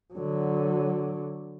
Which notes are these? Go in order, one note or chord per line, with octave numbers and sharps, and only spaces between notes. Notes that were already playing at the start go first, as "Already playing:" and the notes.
D3 F#3